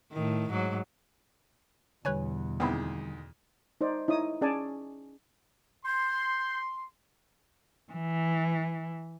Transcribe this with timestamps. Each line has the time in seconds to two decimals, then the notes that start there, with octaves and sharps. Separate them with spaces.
0.12 A2 D#3
0.49 G#2 F#3
2.05 E2 B2 D3 G3 B4 C#5 G#5
2.60 D2 D#3 G#3 B3 C4 E4
3.81 D#4 C5 D5
4.08 D#4 E4 C#5 D#6
4.41 C#4 G#4 D5 G#5 A5
5.86 C6 G6
7.92 E3